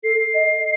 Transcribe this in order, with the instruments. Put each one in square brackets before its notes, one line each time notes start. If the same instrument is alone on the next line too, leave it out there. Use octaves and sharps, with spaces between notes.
[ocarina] A4 [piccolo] C7
[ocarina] D#5